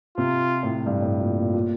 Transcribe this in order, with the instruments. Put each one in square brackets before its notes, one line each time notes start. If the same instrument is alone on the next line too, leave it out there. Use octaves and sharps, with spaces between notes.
[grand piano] C3 [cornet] F4
[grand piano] A2
G2
A2
A#2
A#2
A#2